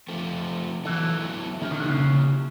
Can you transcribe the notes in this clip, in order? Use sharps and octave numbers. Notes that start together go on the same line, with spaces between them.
F3 A3 C4
E3 F#3 B3 E4 A4
D#3 A#3 C#4 E4 G4
D#3
D3
C#3